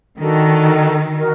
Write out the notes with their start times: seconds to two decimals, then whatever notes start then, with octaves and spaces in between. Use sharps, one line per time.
0.19 D#3 D4 F#4 A4
1.17 F#4 A#4 D#5